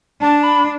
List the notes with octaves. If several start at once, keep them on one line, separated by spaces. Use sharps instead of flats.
D4 A5
B5